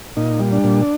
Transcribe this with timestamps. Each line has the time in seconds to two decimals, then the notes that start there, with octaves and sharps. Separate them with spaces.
0.17 A#2 D#4
0.40 G3
0.52 D4
0.64 A#2